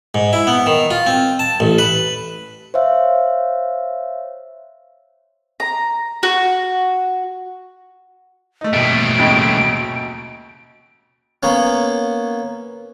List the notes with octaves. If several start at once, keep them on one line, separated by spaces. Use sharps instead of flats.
G#2
E4
B3
D#3
F4
C4
A5
A1
B4
C5 C#5 E5 F5
A#5
F#4
A3 D#4
D#2 B2 A3 D7
G#1 D#2 C#3
A#3 B3 C#4